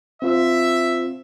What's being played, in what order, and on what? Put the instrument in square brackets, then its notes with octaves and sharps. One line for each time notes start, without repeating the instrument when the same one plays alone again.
[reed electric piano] C4 F4 C5 [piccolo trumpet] E5